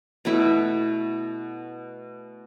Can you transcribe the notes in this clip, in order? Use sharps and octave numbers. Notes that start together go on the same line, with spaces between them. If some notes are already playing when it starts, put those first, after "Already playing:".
B2 A3 E4